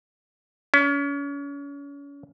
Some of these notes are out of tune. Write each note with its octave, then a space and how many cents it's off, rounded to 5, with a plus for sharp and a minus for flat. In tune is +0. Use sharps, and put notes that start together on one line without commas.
C#4 +35